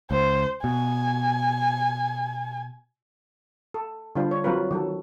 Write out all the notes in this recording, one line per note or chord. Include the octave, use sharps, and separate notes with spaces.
C#2 C5
B2 G#5
A4
D3 G3 D4 F4 C5
C#5
F#3 C4 F4 A#4 B4
D#3 F#3 A4